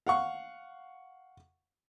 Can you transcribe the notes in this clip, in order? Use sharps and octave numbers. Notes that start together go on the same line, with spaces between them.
F5 F#5 C#6